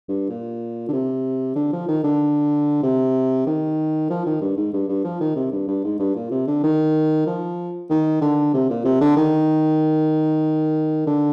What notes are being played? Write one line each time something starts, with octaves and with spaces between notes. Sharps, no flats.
G2
A#2
D3
C3
D3
F3
D#3
D3
C3
D#3
F3
D#3
G2
G#2
G2
G2
F3
D#3
C3
G2
G2
G#2
G2
A#2
C3
D3
D#3
F3
D#3
D3
C3
A#2
C3
D3
D#3
D3